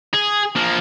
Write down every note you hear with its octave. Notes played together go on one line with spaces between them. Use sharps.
G#4
F3 A#3